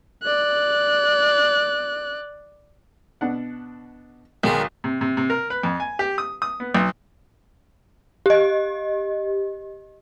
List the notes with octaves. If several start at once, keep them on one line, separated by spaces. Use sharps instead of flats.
D5 F#6
B2 D4 F#5
B1 D#3 G#3 G#4
C3
C3
C3
A#4
B4
F2
G#5
G4
D#6
D#6
B3
B1
G4 D#5